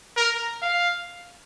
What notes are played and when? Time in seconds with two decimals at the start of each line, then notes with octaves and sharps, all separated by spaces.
0.16 A#4
0.62 F5